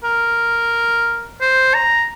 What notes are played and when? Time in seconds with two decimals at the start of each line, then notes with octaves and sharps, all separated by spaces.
0.04 A#4
1.41 C5
1.75 A#5